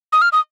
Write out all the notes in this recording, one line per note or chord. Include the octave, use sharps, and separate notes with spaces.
D#6
F6
D#6